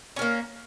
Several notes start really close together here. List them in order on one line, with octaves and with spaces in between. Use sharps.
C#4 A#4 A#3